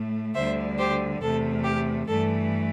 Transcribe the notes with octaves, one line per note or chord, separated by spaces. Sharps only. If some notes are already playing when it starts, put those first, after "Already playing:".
Already playing: A2 A3
D2 D3 G3 C5 E5
G4 C5
E2 C3 A3 A4
G4
G2 E3 A3 A4